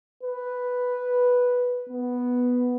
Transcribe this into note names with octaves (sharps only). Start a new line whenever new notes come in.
B4
B3